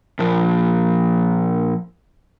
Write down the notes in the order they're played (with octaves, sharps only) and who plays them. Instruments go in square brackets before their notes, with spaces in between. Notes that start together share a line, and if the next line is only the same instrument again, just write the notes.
[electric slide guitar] A#2 F3